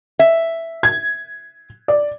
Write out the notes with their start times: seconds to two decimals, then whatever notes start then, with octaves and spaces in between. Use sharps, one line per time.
0.19 E5
0.83 G#6
1.88 D5